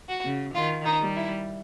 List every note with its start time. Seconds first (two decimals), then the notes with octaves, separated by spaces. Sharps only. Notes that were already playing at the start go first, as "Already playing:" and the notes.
0.09 F#4
0.25 C#3
0.55 D#3 F4
0.85 D#4
1.01 G3
1.16 E4